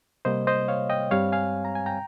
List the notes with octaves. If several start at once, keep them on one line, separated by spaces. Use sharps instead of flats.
C3 G3 A#3 C5 D#5
C5 D#5
C#5 F5
D#5 G5
G2 G3 C4 C#5 F5
F5 G#5
A#5
G#5
G5 A#5